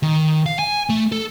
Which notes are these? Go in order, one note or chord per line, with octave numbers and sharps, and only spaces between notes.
D#3
F5
G#5
A3
A4